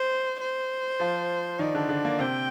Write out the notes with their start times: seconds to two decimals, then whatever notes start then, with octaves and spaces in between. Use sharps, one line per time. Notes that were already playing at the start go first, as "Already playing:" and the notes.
Already playing: C5
0.41 C5
1.00 F3 F4
1.59 D#3 D#4 D5
1.75 D3 D4
1.89 D3 D4
2.05 A#3
2.19 C3 C4 G5